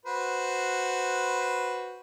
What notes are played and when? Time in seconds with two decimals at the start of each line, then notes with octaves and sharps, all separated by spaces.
0.05 F#4 B4 C5